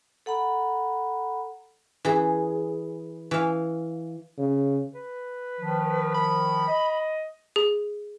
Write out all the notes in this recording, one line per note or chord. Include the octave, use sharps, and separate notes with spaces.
A4 F#5 A#5 B5
E3 G#4
E3 F5
C#3
B4
D#3 F3
B5
D#5
G#4